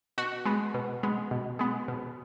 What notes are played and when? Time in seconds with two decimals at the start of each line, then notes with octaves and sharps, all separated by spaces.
0.18 B2 F#4
0.45 G#3 B3
0.74 B2
1.03 G#3 B3
1.31 B2
1.59 G#3 B3
1.88 B2